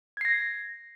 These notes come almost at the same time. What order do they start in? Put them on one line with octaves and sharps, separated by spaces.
G#6 C7 A#6